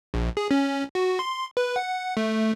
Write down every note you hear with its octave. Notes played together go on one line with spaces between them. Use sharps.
A#1
G#4
C#4
F#4
C6
B4
F#5
A3